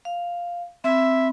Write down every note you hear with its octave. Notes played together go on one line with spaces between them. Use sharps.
F5
C4 E5 B5